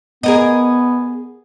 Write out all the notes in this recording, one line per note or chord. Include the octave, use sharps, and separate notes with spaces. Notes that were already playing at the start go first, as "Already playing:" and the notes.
B3 G#4 A#4 D#5